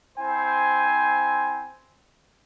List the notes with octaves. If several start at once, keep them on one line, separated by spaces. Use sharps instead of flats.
C4 E4 C5 G#5